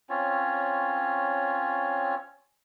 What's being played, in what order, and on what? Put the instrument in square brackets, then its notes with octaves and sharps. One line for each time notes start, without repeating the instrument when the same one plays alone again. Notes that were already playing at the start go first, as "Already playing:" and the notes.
[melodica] C4 C#4 F4 C#5